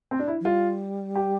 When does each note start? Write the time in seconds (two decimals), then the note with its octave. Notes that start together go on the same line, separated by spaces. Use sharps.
0.11 C4
0.19 D4
0.28 E4
0.41 F3
0.45 G3 F4
1.16 G4